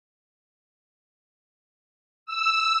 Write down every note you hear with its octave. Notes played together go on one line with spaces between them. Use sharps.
E6